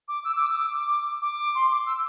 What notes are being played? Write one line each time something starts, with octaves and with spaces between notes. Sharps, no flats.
D6
E6
D6
E6
D6
D6
C6
D6
E6